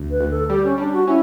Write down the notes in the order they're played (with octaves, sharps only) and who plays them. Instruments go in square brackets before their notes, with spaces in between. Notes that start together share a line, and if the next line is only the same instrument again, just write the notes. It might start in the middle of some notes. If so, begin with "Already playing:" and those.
Already playing: [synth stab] D2
[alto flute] B4
[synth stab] D2
[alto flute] A4
[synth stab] G3 [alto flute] G4
[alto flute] C#4
[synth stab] G3 [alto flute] D4
[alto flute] F#4
[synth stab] C#4 [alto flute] E4